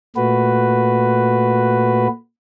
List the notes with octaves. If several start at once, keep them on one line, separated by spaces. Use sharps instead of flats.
A#2 A3 F#4 B4